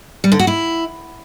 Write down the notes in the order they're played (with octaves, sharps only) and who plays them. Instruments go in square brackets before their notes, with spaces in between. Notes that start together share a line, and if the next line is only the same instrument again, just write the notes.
[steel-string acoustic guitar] G3
D3
F#4
E4